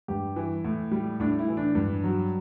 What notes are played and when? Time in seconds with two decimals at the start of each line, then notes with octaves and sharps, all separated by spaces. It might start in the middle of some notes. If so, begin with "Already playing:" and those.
0.08 G2 G4
0.36 E3
0.64 A2
0.92 G3
1.20 A2 D4
1.39 E4
1.48 E3
1.57 D4
1.75 G2
2.04 F#3